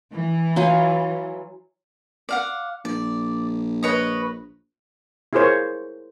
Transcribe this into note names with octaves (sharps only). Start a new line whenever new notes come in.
E3
F#3 F4 G#5
D5 F5 F#5
A#1 D5
B4 C#5 D#5
E4 F4 G#4 A#4 C5 C#5